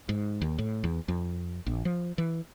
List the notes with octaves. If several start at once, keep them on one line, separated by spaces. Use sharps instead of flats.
G#2
D#2
A2
E2
F2
A#1
F3
E3